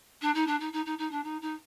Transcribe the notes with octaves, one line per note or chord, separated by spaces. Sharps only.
D4
D#4
D4
D#4
D#4
D#4
D#4
D4
D#4
D#4